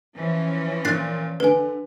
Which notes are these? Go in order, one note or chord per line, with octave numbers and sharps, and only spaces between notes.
E3 F3 C#4
A#2 F#6 A6 C7
D3 B4 G#5